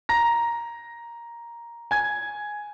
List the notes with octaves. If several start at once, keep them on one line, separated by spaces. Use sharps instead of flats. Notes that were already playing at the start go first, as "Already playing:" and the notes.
A#5 A#6
G#5 G#6